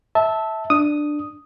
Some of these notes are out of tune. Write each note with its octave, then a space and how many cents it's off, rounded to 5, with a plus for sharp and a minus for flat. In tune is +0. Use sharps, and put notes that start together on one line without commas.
E5 -15 A5 +0
D4 +10 D#6 +0